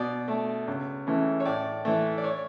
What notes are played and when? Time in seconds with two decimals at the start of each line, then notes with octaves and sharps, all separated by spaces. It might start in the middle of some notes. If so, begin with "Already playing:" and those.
Already playing: B2 D5
0.28 A3
0.68 C#2
1.07 C#3 E3 A3
1.40 C#5
1.45 A2 D5
1.85 E3 A3
2.18 D5
2.24 C#5